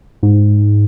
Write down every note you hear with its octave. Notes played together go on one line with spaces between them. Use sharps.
G#2